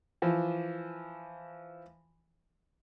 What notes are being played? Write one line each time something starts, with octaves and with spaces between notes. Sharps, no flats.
E3 F3